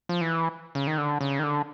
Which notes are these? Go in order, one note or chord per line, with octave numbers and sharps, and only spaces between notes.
F3
E3
C#3
D#3
D3
C#3
D#3
D3